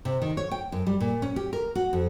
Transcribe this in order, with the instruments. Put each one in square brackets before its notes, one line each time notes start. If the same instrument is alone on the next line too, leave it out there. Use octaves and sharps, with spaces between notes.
[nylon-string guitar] C3
D#3
C#5
G5
F#2
G3
A#2
C#4
G4
A#4
F#4
F2